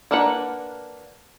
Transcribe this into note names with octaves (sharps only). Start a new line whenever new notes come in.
A#3 D4 A#4 B4 F#5